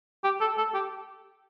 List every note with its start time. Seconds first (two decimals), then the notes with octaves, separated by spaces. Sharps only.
0.24 G4
0.41 A4
0.58 A4
0.74 G4